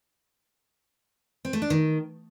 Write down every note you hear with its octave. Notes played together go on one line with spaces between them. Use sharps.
C4
A3
D4
D#3